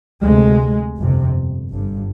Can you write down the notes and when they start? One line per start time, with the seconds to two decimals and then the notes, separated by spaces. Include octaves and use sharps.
0.22 D2 C3 G#3
0.98 G1 F2 C3
1.72 G1 G2